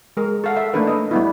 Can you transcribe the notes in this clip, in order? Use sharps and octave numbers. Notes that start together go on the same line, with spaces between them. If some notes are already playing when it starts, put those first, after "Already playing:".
G#3 A#4
A4 F5 F#5
A4 E5
A3 A#3 D4 D#4 A4 B4
B4 D#5
G3 B3 E4